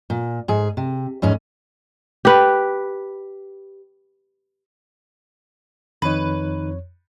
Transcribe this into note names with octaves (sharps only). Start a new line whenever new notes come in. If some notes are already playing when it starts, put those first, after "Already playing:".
A#2
G#2 G#4
C3
E2 G#2 C#4 G#4
G4 B4
F2 D#3 D#4 B4 C#5